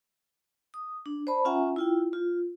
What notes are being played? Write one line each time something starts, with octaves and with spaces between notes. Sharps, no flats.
D#6
D4
C5 D5 A5 B5
C#4 F4 E5 F#5 G#5 A#5
E4 F4 G5
F4